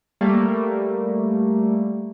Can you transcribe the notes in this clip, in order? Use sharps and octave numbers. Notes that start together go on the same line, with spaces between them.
G3 A3 A#3